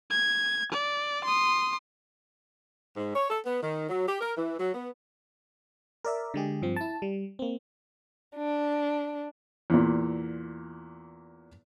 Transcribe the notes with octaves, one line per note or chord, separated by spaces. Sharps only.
G#6
D5
C6 D#6
G#2
C#5
A4
B3
D#3
F#3
G4
A#4
E3
F#3
B3
A#4 D5 E5
D3 G#3 G4 G#4
G2 F3 C4
E4 A5
G3
A#3 C4
D4
E2 A#2